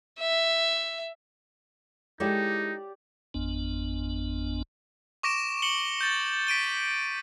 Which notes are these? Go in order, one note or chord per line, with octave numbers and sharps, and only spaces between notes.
E5
G#3 D#4 E4 G4 A4 D5
G#1 F2 B3 D4
C#6 D6 A#6 D7 E7
C#7 F#7 G7
G6 A6
B6 D7 D#7 G7